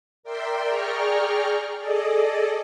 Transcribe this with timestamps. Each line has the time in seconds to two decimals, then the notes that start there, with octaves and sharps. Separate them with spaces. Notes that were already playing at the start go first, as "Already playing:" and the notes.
0.23 A#4 D5 E5 G5 C6
0.69 G#4 D5 G5 A#5 C#6 F6
1.79 G#4 A4 D5 D#5